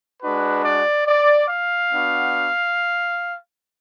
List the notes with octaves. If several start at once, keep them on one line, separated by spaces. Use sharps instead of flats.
G#3 D4 F#4 B4
D5
D5
F5
B3 D4 F#4